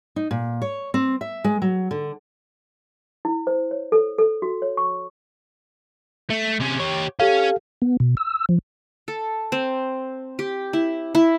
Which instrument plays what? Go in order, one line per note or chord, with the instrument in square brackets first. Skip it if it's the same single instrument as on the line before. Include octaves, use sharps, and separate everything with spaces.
[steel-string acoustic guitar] D#4
A#2
C#5
C4
E5
G#3
F#3
D3
[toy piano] E4
C5
C#5
A4
A4
F#4
C#5
C#6
[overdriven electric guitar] A3
C3 C#4
G4 C#5
[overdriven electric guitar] C#4 [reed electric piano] G4 A4 F5
[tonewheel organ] B3
B2
E6
F3
[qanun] A4
C4
G4
E4
E4